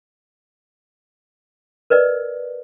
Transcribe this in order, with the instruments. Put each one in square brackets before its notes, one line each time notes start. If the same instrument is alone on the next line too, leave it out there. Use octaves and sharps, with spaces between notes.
[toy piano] A#4 B4 D5 D#5